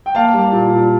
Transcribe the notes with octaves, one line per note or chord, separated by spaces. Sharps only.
G5
A#3 F5 A5
G3
A#2
A#2